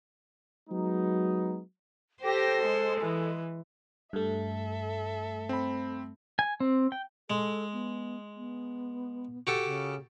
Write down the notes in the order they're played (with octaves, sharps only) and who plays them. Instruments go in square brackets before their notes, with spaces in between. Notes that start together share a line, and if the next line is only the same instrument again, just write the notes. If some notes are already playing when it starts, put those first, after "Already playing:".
[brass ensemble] F#3 G#3 B3 D#4
[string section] G4 A#6 [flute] A4 [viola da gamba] C5
[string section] G#3
[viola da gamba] E3
[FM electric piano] G2 A3 [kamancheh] A4 E5
[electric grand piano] C4 B5
[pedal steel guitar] G#5
C4
G5
[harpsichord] G#3 [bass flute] A4
[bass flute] B3
B3
[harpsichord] F#4 G4 A4
[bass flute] C#3